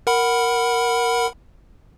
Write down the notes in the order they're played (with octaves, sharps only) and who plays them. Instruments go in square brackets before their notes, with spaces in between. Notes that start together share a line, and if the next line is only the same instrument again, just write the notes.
[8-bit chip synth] A#4 F#5 B5